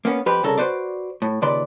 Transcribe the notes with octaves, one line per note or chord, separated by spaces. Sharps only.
A#3 B3 C#4
F2 G4 B4 C5
C2 C#3 A4 A#4
F#4 B4 C5 D5
A2
D#2 A#2 C#3 B4 D5 C6